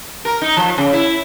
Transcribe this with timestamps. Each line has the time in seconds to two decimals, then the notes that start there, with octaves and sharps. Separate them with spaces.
0.25 A#4
0.42 D#4
0.57 F3
0.78 C#3
0.93 E4